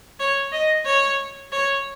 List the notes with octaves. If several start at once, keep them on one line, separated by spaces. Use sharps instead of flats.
C#5
D#5
C#5
C#5